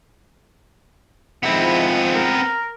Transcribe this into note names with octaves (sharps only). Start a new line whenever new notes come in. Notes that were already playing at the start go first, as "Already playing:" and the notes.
D#3 F3 G#3 B3 C4 E4
A#4